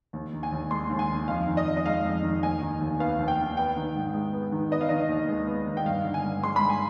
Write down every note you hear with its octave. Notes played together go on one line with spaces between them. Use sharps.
D#2
D#3
G#5
D#2
G#3 C6
D#2
G#5
D#3
F2 F5
D#3
D#5
F2
D#5
G#3 F5
F2
D#3
D#2 G#5
D#3
D#2
B3 F5
D#2
G5
D#3
B3 G5
D#3
G#2
G#3
B3
D#3
B3 D#5
F5
D#3 D#5
D#2
G#3
B3
D#3
G5
G2 F5
D3
G#5
G2
G#3 C6
B5
G2
G#5